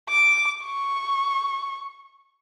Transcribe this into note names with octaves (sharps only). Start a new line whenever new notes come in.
D6
C#6